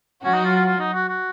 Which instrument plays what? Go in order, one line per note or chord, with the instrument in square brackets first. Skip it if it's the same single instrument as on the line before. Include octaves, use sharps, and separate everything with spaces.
[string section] F#3 F#4 [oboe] C#4
[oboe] D#4
F4
F4
F4
D#4
F#4
F#4